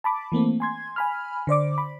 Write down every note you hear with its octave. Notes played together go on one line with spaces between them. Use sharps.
A5 B5 D6
E3 A3 A#3 C4
G#5 C6 G#6
G#5 B5 F6
D3 C5 D5 D6
B5